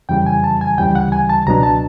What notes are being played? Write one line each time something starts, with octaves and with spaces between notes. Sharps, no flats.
F2 C#3 E3 G3 G5
G#5
A5
G#5
D2 C#3 E3 G3 G5
F#5
G#5
A5
C#2 B2 F#3 B3 D4 A#5
A5